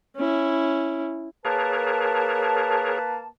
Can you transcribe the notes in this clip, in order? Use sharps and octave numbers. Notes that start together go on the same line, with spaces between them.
C#4 E4
A#3 G#4 A#4 B4 C#5 A5